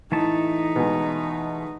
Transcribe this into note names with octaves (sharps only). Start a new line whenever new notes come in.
A2 E3 A3 D#4 A5
B2 G#3